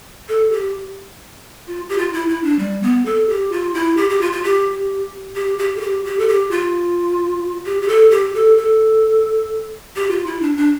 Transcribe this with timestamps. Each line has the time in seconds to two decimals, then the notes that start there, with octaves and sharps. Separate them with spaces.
0.29 A4
0.52 G4
1.67 F4
1.89 G4
1.98 F4
2.13 E4
2.29 E4
2.43 D4
2.59 G3
2.83 B3
3.06 A4
3.29 G4
3.52 F4
3.74 E4
3.97 G4
4.10 G4
4.21 F4
4.32 F4
4.43 G4
5.36 G4
5.59 G4
5.77 A4
5.81 G4
6.05 G4
6.19 A4
6.28 G4
6.51 F4
7.66 G4
7.82 G4
7.88 A4
8.11 G4
8.35 A4
8.58 A4
9.96 G4
10.11 F4
10.27 E4
10.42 D4
10.57 D4